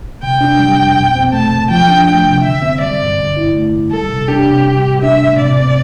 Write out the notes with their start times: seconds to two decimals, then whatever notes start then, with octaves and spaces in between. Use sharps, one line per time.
0.23 C3 G5
0.41 D4
0.59 G3
0.78 F2
0.97 B2
1.15 C4
1.33 A3 A5
1.52 C2
1.70 F3 G5
1.89 D4
2.07 A3 G5
2.25 C3
2.44 D3 E5
2.62 C4
2.81 G3 D5
3.00 G2
3.18 D3
3.37 E4
3.54 A3
3.73 F2
3.91 G3 A4
4.09 C3
4.28 D4 G4
4.47 C3
4.65 G3
4.84 A2
5.02 D4 E5
5.21 A2
5.38 C3 D5
5.57 C4